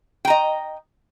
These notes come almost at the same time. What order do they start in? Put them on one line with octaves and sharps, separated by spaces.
G5 A#5 D#5